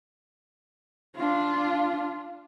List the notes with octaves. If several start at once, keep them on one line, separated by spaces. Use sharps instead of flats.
D4 F4